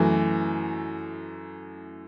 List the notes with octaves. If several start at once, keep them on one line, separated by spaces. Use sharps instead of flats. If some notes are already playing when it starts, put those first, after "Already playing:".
Already playing: F#2 E3 A3